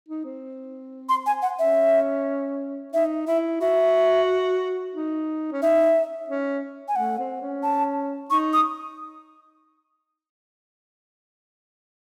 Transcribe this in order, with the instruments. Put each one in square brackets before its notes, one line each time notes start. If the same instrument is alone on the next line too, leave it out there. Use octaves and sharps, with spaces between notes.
[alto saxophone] D#4
C4
[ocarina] C6
G#5
F#5
[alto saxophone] C#4 [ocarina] E5
[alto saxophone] D#4 [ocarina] E5
[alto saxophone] E4 [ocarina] E5
[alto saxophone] F#4 [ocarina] E5
[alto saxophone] D#4
C#4
[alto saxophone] D#4 [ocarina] E5
[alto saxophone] C#4
[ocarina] G#5
[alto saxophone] A3 [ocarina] F#5
[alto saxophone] C4
C#4
[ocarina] A5
[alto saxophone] D#4 [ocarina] C#6
[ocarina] D#6